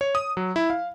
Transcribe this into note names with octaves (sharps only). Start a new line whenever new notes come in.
C#5
D#6
F#3
E4
F5